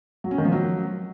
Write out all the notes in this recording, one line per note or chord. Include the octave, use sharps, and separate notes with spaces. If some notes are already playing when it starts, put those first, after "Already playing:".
F#3
C#4
D#3
F3
F#3